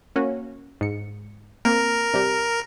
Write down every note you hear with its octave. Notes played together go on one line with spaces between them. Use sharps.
A#3 C#4 F#4
G#2 C#7
A#3 C4 A#4
C3 G3 G4